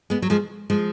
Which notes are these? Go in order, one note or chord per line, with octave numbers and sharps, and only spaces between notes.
G#3 B3
F#3
F3 G#3
F3 G#3